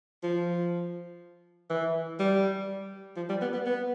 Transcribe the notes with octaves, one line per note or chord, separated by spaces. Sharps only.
F3
E3
G3
F3
G3
B3
B3
B3